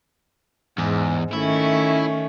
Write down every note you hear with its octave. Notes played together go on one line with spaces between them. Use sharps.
E2 G#2
D#3 A3 C#4 E4